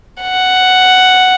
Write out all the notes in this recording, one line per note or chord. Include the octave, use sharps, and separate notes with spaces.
F#5